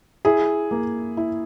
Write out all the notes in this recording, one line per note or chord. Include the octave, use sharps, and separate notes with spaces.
E4 G#4
A#3
E4